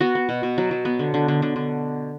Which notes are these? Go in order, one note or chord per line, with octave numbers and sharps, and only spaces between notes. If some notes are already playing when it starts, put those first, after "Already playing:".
B3 F#4
B3
B2
B2
F#3
F#3
B3
D3
D3
D3
D3
D3